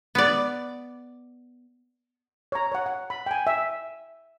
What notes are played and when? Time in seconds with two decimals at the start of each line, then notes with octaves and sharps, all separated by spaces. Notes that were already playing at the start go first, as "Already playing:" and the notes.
0.15 B3 D5
2.52 C#5 A#5
2.72 C#5 F#5
2.86 F#5
3.10 B5
3.26 G5 G#5
3.47 E5